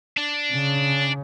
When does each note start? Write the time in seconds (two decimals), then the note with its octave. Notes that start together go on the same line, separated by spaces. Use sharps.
0.17 D4
0.53 C#3